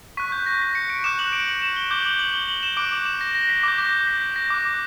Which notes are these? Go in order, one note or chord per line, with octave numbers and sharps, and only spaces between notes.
C#6 F#6 B6
G6
A#6
B6
C#7
D7
D6 F#6 E7
F#7
D7
F#7
E7
G7
D6 G6
F#7
F#7
G7
F#7
E7
D6 F#6 D7
F#7
E7
A#6
A#6
B6
D6 G6
A#6
G6
B6
G6
A#6
D6 F#6